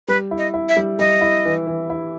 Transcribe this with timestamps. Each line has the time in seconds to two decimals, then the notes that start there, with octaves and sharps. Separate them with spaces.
0.08 G3 B4
0.31 E4
0.38 D#5
0.54 E4
0.69 E5
0.77 G3
0.99 G3 D#5
1.21 E4
1.45 E3
1.67 E3
1.90 E4